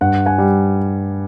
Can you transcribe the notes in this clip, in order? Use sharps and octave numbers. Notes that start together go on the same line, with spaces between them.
G2 F#5
F#5 G#5
G3